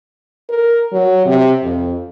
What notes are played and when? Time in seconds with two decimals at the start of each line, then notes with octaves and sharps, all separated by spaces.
0.49 A#4
0.93 F#3
1.26 C3
1.63 F2